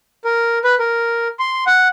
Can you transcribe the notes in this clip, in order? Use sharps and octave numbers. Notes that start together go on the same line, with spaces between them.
A#4
B4
A#4
C6
F#5